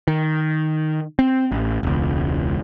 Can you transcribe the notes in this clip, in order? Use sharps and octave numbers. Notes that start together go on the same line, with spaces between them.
D#3
C4
A1
E1 C#2